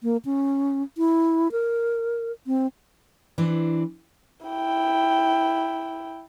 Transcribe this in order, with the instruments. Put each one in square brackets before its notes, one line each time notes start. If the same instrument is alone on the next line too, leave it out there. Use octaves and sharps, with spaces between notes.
[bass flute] A#3
C#4
E4
A#4
C4
[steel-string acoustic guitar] E3 C4 D4
[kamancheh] E4 G5